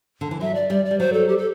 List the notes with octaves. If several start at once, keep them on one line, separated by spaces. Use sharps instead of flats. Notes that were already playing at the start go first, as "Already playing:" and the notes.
D3
E3
F#3 E5
D5
G3 D5
D5
G3
F#3 C5
A4
G4
A4